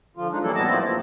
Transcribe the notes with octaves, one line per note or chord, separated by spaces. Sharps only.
D3 F3 F4
G#3 D4 D#4
E3 F#3 G3 A#3 E4 A4
F2 A2 G3 B3 D#5 A5
F3 A3 A#3 C4 E4
G2 C#3